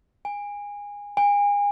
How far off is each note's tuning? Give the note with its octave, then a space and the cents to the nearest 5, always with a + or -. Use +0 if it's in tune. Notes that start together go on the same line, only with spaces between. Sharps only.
G#5 -20
G#5 -30